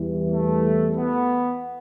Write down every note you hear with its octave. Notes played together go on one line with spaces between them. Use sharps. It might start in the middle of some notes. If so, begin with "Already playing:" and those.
Already playing: E2 E3 G3
A3
B3